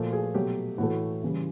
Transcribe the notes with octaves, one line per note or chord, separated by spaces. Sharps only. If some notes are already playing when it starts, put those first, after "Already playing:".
Already playing: A#2 F3 A3
G#4
B2 F#3 A3 G4
A2 E3 A3 F#4
C#3 E3 G3